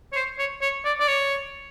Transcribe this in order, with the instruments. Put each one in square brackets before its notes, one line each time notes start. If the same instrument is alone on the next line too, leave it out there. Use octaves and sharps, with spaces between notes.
[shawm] C#5
C5
C#5
C#5
D5
D5
C#5